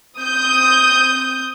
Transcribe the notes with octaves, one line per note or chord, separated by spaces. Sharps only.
C4 D#6 G6